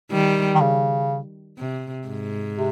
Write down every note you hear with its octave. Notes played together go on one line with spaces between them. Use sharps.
D#3 G3
D#3
C#3
C3
G#2
C3